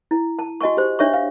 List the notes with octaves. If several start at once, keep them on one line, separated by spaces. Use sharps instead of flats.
E4
A5
F#4 D#5 G#5 C#6
G4 C5
D4 C#5 E5 C#6
F5